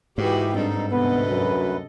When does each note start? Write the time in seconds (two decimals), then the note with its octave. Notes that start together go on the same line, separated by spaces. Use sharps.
0.18 G#2 E3 F#4 G4 B4
0.55 G2 C4 D#4 A4
0.91 D2 C3 B3 A4 B4 D#5
1.29 F#2